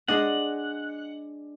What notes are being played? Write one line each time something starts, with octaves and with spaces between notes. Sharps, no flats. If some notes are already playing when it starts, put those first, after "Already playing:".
G#3 D4 G#4 D#5 F#5